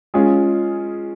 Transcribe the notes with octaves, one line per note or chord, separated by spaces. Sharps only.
G#3 C#4 F4 G#4